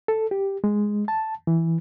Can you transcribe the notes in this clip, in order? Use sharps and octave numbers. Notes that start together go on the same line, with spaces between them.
A4
G4
G#3
A5
E3